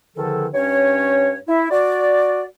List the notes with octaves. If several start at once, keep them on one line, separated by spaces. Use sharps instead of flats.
E2 D3 D#3 F3 A4
G2 C#4 C#5
E4
F#4 D5